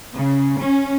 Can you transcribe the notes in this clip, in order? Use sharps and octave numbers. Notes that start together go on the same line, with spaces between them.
C#3
C#4